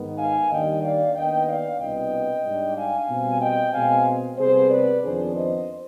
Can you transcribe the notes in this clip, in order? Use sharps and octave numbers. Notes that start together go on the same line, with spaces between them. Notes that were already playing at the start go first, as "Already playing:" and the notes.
Already playing: G#2 D#3 B3
F5 G#5
D#2 D#3 G3 D4 D#5 G5
D5 F5
D#2 D#3 B3 D4 D#5 G5
D5 F5
C2 B2 B3 D4 D#5 G5
G#2 G3 D4
F5 G#5
B2 G3 C4
D#5 G5
B2 G#3 C4 F5 G#5
C3 G3 B3 G#4 C5
B4 D5
F2 D#3 B3 D4 G#4 C5
C5 D#5